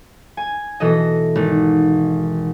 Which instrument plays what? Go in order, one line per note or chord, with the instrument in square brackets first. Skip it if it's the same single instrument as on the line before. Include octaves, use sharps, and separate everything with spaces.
[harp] G#5
B2 E3 A4 D#5
G#1